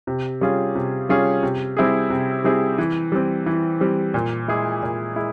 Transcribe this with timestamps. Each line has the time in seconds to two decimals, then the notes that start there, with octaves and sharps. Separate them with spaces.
0.07 C3
0.41 G3 C#4 F4 G#4
0.75 C3
1.09 G3 C#4 F4 G#4
1.43 C3
1.77 G3 C4 E4 G#4
2.10 C3
2.44 G3 C4 E4 G#4
2.78 E3
3.12 G3 C4
3.46 E3
3.80 G3 C4
4.14 A#2
4.48 G#3 E4 G#4
4.82 A#2
5.16 G#3 E4